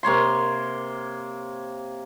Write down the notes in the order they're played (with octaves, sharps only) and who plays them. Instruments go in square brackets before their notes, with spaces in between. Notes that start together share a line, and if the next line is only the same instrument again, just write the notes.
[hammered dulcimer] C3 A#3 C#5 C6